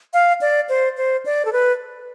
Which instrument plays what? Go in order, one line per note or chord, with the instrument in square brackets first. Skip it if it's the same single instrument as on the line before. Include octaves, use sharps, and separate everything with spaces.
[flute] F5
D5
C5
C5
D5
A4
B4